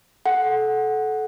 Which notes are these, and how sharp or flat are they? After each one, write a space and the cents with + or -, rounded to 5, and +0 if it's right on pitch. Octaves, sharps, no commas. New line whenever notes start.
A4 -25 F#5 +0